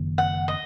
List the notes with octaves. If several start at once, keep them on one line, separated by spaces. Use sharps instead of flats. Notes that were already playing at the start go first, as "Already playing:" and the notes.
Already playing: F#1 F#2 D#3 A#3
F#5
D#5